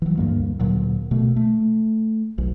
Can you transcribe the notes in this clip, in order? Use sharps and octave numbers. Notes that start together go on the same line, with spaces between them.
E3 F#3
D2 G2 G#3 A#3
D2 A#2 F#3
B2 A3
A3
B1